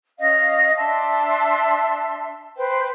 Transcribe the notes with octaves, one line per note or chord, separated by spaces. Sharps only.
C#4 D#5 F5
D4 E5 A5 C6
B4 C5 G5